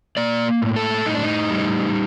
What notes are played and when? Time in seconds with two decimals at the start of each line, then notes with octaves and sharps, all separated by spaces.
0.17 A#3 D5
0.62 A2
0.76 A4
1.05 A2 D#4
1.15 D4
1.23 D#4
1.50 G3